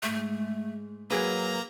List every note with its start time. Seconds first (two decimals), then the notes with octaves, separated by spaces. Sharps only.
0.03 G#2 G#3 A3
1.10 F#3 A#3 F#4 G#4 B4 A#5